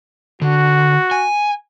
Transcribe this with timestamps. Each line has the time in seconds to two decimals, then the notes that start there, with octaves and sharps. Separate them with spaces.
0.42 D3 F#4
1.11 G#5